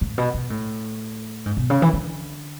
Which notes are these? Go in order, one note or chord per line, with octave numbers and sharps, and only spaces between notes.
A2
B2
B2
A2
G#2
B2
C#3
E3
D3